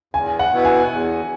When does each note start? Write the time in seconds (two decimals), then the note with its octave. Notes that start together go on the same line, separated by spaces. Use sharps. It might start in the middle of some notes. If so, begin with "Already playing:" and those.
0.14 E2 G#5
0.39 F#5
0.52 B2 B3 E4 B4
0.65 G#5
0.91 E2